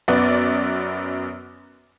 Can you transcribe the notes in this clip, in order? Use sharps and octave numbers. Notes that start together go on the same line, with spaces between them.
F#2 B3 B4 D5